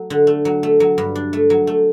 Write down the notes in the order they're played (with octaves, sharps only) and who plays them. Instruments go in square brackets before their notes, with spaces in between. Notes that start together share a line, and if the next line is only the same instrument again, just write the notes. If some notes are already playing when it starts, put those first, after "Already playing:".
Already playing: [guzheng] F#3 A3
D3
A3
F#3
A3
F#3
G2
D4
A3
F#3
A3